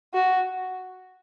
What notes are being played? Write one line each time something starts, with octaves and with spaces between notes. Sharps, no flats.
F#4